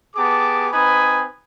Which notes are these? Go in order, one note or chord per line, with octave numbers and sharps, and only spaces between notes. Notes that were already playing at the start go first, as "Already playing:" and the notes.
B3 G4 G#4 A5 D6
C4 D#4 B4 G#5 B5 D#6